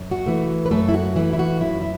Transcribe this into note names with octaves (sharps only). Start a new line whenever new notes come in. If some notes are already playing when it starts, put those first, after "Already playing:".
Already playing: F#2
F#4
E3 A3
B4
F#2 A3 A4
E4
F#4
E3 A3 E4
E4
F#4
F#2 E4
E4